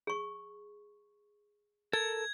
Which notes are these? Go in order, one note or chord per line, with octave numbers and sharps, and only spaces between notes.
G#4 C#6
A4 A#4 G#6